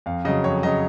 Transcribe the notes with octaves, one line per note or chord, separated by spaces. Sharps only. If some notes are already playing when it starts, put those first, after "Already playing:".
F2 F5
C#3 F#3 D#5
F2 C#5
C#3 F#3 D#5